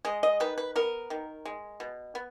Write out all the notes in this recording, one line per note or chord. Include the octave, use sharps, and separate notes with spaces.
G#3 D#5
D#5
D#3 B4
B4
B3 A#4
D#3
G#3
B2
B3